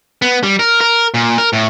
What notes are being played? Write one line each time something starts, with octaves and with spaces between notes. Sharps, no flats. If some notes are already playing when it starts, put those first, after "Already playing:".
B3
G3
A#4
A#4
A#2
A#4
A2